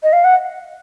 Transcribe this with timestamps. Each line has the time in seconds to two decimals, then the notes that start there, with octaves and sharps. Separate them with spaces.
0.03 D#5
0.13 F5
0.24 F#5